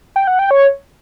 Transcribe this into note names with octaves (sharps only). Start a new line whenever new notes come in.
G5
F#5
G5
C#5